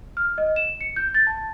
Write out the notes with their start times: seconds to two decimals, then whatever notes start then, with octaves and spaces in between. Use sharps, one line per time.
0.17 F6
0.38 D#5
0.56 E7
0.81 C#7
0.96 G6
1.14 A6
1.27 A5